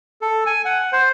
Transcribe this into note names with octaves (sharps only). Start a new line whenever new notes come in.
A4
G#5
F#5
C5